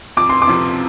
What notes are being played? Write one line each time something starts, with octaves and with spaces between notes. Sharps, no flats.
F2 D6
C6
D6
C3 F3